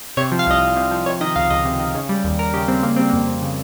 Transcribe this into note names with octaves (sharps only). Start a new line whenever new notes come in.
C3 C#5
F3
F5
C2 D#5
C2
C3
F3
C3 C#5
D#3 D#5
C#2 F5
C#2 D#5
C3
D#3
C#3
G3
D#2
D#2 A#4
C#3 G4
G3 C4
C#3 A#3
G3 C4
F2 A#3
F2
C#3